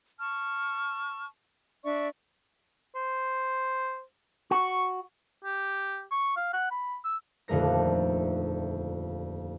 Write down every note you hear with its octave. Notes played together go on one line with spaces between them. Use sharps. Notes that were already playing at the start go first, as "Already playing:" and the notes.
A5 C#6 F6
D4 D5 E5 C#6
C5
F#4 C#6
G4
C#6
F5
F#5
B5
E6
D#1 F2 D3 A3 A#4 A#6